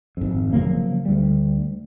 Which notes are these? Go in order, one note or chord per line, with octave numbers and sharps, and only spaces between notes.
G#1 F2
C#3 F3 F#3 A#3
D2 G3